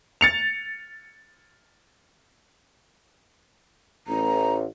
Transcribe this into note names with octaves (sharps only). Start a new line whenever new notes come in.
A6 C#7 F7
A1 A#5